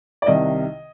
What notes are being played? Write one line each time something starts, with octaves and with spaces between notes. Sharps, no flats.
D5
C2 C3 D#3 D#5